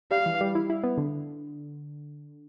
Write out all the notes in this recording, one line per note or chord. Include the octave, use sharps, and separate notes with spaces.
G3 F5
E3
G3
E4
E4
B3
D3